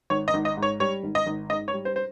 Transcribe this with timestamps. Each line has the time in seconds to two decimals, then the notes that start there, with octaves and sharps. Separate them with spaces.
0.10 G#1 C#5
0.28 D#5
0.34 G#1
0.45 D#5
0.57 G#2
0.62 C#5
0.80 G3 C#5
1.04 G#1
1.15 D#5
1.27 G#1
1.50 G#2 D#5
1.68 C#5
1.74 G3
1.85 C5
1.96 C5